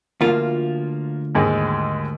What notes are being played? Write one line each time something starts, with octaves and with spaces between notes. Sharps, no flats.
D2 F3 A#3 F4
D#2 G#2 G#3